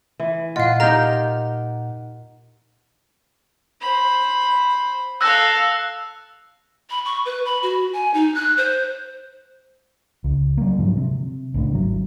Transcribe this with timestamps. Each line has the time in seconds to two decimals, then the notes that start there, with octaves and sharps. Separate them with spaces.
0.20 E3
0.56 A#2 F4 D#5 F5 F#5
0.80 D#4 G4 A#4 A#5 F6
3.81 C5 B5
5.21 A4 F5 E6 F#6 A#6
6.90 B5
7.05 C#6
7.25 B4
7.45 B5
7.63 F#4
7.93 G#5
8.14 D#4
8.35 F#6
8.57 C5
10.24 C#2
10.57 F#3 A#3
10.78 G#2 D3 F3 F#3
10.97 C3
11.54 C#2 A2 D3
11.73 G#1 F#3